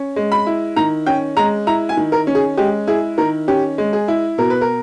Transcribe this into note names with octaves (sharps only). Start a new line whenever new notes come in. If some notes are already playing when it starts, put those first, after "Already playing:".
Already playing: C#4
G#3
B5
E4
D#3 A#5
C#4 G5
G#3 A#5
E4 A#5
G#5
D#3
A#4
C#4
G#4
G#3 G4
E4 G#4
D#3 A#4
C#4 G4
G#3
G#4
E4
B2 A#4
B4
A#4